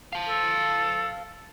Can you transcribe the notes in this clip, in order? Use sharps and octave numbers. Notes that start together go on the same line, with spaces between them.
F5 A5
A4